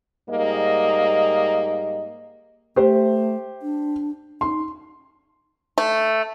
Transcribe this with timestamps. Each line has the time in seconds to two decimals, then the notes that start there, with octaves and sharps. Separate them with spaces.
0.30 G#2 G3 A#3 D#5
2.76 A3 G4 C5
3.62 D4
4.41 D#4 C6
5.78 A3